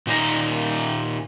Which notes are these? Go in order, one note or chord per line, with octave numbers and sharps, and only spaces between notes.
A#2 D#3 D#4 A4 A#5